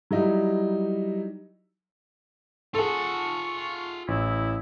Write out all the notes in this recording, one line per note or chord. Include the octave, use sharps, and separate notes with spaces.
F#3 G3 D#4 E4
F4 G#4 A4 F#5 C#6
A1 E4